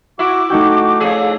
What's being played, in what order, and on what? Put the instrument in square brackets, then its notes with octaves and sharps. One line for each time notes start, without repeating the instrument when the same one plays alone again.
[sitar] E4 [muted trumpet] F#4 [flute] D6
[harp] A3 D#4 G5 [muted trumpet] F#4
[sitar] F2 C#3 G#4